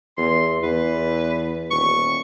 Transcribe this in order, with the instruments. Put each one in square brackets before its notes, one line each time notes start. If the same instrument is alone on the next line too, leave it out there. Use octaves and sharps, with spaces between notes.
[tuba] E2 [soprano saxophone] C6
[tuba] E2 [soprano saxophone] B4
[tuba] D#1 [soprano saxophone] C#6